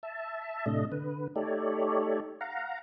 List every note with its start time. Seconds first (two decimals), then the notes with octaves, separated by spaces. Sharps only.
0.03 E5 A5
0.66 A2 C3 A3 D4 D#5
0.92 D3 B4
1.36 A3 D#4 G4 A4 C#5 D5
2.41 F5 F#5 A#5